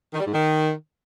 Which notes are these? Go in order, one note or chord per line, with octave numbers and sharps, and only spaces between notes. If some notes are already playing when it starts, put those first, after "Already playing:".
D#3
G3
G#2
D#3